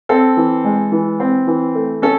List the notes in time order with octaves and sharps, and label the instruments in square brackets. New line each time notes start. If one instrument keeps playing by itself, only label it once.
[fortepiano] C4 A4
E3
G#3
E3
C4
E3
A3
C#4 A4